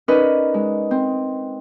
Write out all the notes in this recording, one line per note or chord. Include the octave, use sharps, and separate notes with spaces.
C#4 D#4 A#4 B4 D5 D#5
G#3
C4